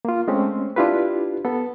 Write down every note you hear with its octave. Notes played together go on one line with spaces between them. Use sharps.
A#3 F4
G#3 A3 C4 C#4
D4 E4 F4 G4 B4
B3 A4